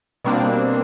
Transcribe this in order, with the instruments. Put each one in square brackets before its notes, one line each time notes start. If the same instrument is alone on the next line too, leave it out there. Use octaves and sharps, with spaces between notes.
[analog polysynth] B2 G3 A#3 C4 D4